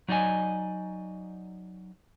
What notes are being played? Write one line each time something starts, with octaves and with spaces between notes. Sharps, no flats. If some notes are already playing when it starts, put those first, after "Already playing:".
F#3 D#4 D5 D#5 G#5